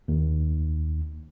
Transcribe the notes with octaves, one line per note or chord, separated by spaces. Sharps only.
D#2